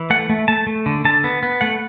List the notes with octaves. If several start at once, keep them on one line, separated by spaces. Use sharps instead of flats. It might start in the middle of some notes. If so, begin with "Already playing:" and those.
Already playing: E3
A3 F#5
A3
A3 A5
A3
D3
D3 A5
B3
B3
A3 F#5